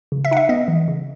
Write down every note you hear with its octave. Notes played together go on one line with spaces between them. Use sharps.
C#3
E5
D#4 F#5
E5
B3 D#5
E3
C#3